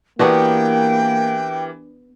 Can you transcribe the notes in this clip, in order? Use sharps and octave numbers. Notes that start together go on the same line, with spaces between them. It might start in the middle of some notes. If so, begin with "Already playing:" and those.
E3 A#3 B3 D4 F#4 G4 A#4 G5